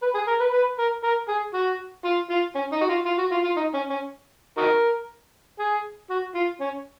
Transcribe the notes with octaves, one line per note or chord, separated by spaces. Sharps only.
B4
G#4
A#4
B4
B4
A#4
A#4
G#4
F#4
F4
F4
C#4
D#4
F#4
F4
F4
F#4
F4
F4
D#4
C#4
C#4
D#4 F#4 A#4
G#4
F#4
F4
C#4